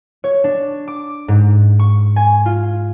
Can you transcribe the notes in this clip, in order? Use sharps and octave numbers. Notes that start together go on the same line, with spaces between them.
C#5
D4
D6
G#2
C#6
G#5
F4